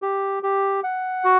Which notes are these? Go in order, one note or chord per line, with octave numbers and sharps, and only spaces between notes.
G4
G4
F#5
F#4